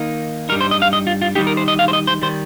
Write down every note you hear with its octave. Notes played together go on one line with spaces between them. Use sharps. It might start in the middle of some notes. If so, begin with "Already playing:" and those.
Already playing: D#3 A#3 D#4
G2 G3 D#4 A#4
C5
D#5
F5
D#5
F4
F4
D#3 G3 D#4 G4
A#4
C5
D#5
F5
C5
D#5
C5
D#3 G3 C5